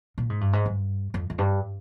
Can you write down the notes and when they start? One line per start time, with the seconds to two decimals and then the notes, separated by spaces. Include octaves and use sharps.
0.18 A#2
0.30 G#2
0.41 G2
0.53 G#2
0.66 G2
1.14 F2
1.30 F2
1.38 G2